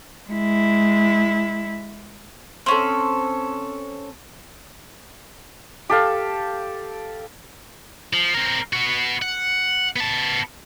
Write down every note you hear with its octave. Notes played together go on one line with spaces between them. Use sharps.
G#3 E4
C4 C#4 A4
G4 A4 F5
F3
C4 A#4
B3 F#4
F#5
B3 A5